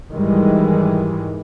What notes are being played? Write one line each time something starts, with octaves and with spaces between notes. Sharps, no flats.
G#2 D#3 E3 G3 G#3